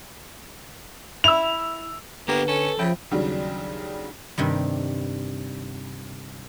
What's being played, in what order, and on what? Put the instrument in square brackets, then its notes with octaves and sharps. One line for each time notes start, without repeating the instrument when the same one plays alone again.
[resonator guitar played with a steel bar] E4 [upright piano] E6 F7
[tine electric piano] D3 [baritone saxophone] A#3 [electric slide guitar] B3 G4 [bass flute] B4
[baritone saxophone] C#4 [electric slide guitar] A4
[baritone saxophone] C#3 [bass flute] F3 [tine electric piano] E5 G5 B5
[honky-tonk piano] D#2 C#3 F#3 G3 D4
[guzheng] G2 C3 D#3 G3